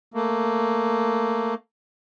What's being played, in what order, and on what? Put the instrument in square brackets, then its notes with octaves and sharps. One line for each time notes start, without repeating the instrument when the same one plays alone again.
[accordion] A3 A#3